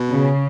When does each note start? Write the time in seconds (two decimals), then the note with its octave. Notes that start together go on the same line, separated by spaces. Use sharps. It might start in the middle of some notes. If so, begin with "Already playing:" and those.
Already playing: B2
0.12 C#3